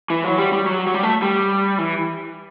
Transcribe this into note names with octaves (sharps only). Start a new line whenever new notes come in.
E3
F#3
G3
G3
F#3
F#3
G3
A3
G3
E3